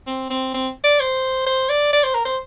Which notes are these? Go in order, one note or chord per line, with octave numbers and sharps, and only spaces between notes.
C4
C4
C4
D5
C5
C5
D5
D5
C5
A#4
C5